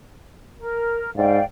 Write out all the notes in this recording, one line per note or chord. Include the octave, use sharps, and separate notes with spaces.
A#4
G#2 D5 F5 G5